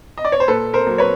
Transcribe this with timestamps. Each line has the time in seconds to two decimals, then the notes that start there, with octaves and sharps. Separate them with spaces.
0.18 D#5
0.25 D5
0.32 C#5
0.40 C5
0.48 A#2 A4 B4
0.74 A#4 C5
0.87 F#3 A#3
0.98 B4 C#5